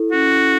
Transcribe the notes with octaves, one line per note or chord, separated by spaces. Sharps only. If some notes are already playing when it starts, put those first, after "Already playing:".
Already playing: E4 A4
C#4 F#4